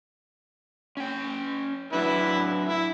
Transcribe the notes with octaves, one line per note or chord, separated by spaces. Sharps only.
C#4 G5
F#3 D4 E4 B4
E4